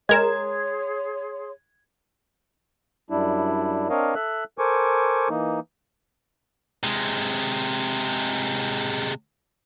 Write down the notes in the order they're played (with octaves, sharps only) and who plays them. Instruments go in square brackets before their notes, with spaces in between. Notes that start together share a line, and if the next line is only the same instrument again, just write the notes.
[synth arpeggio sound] G#3 A#4 E7 [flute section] G#4 C#5 C6 [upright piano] G#6
[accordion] F#2 G3 D4 E4
C4 D4 A#4 C#5 D#5 F5
A4 E5 F#6
A4 A#4 C5 G#5 C#6 D6
E3 A#3 D#4
[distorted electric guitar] C3 G#3